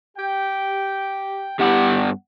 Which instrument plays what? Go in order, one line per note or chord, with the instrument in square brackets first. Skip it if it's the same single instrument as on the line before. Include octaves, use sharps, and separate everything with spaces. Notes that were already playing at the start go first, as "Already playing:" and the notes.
[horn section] G4 G5
[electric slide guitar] G2 B3 F#5 [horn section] G3 E4 G4